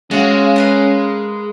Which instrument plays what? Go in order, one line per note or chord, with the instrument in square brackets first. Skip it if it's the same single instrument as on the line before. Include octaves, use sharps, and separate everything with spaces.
[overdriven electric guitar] G#3 [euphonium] C#4 [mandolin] F#4 F5
[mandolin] A#4 B4 F5